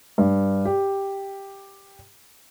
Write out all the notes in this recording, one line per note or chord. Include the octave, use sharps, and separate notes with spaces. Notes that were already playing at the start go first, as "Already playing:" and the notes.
G2
G4